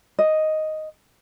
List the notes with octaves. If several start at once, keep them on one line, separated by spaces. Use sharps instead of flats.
D#5